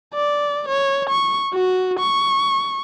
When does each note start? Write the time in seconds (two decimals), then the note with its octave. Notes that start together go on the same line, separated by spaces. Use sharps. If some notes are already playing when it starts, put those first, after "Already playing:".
0.14 D5
0.68 C#5
1.10 C#6
1.54 F#4
1.99 C#6